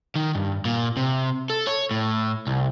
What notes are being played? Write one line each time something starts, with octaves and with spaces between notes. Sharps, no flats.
D#3
G2
A#2
C3
A4
C#5
A2
C2